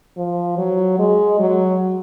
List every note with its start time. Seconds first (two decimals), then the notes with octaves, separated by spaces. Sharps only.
0.17 F3
0.58 F#3
0.99 G#3
1.40 F#3